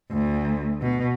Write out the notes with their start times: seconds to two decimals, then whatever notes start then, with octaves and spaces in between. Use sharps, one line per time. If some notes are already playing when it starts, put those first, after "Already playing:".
0.11 D2
0.82 B2